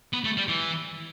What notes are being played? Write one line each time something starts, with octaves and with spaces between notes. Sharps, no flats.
B3
A3
G3
E3